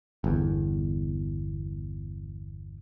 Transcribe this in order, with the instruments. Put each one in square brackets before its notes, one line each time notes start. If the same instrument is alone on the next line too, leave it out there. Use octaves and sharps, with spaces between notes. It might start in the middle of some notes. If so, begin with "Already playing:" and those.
[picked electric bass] G1 E2